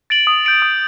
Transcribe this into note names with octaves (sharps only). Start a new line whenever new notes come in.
A6 D7 F#7
D#6
G6 D7 F#7
D#6